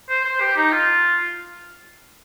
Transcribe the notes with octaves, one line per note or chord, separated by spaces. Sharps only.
C5
C5
G4
D#4
F4